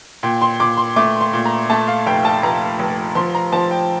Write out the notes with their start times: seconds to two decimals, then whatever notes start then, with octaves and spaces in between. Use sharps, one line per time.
0.23 A#2 G5
0.42 C6
0.60 A#2 D6
0.77 C6
0.96 A3 D6
1.21 C6
1.33 A#2
1.45 A#5
1.70 A3 A5
1.88 F5
2.06 F1 G5
2.25 A5
2.43 F1 A#5
2.79 F1
3.15 F3 C6
3.35 A#5
3.52 F3 A5
3.71 G5